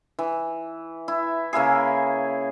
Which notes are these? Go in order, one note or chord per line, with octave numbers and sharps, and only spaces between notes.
E3
E4
C#3 A#3 E4 G#4